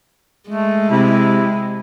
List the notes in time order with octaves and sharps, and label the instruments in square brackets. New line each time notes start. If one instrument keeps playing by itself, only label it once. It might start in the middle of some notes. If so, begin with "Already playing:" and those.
[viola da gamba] G#3 [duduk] A3
[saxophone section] C3 [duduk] E4